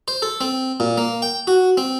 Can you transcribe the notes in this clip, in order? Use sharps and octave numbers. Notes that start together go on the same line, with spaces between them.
C5
A4
C4
A#2
A#3
G5
F#4
C4